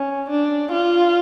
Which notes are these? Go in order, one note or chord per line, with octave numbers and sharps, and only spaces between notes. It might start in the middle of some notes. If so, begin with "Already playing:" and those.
Already playing: C#4
D4
F4